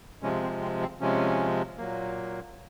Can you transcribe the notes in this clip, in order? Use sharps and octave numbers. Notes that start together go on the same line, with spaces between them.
C3 F3 G#3 C#4
C4
C4
C4
C3 F3 G#3 C#4
A#2 F#3 A#3